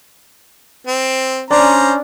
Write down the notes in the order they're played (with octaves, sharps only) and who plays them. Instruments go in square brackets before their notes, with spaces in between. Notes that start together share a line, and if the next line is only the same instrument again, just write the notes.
[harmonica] C4
[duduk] C#4 [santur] D4 [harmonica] C5 A#5